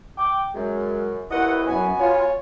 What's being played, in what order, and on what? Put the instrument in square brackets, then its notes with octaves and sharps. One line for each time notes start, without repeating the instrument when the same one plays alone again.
[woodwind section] G5 D6
[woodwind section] F#2 [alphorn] G#3
[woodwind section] D#2 B2 D#5 [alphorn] E4 [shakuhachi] B4 [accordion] F#5
[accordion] F#2 [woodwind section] B3 F#4 [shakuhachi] G#5
[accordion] F4 [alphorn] C#5